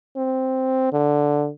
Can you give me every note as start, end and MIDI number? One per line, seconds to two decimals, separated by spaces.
0.17 0.89 60
0.93 1.50 50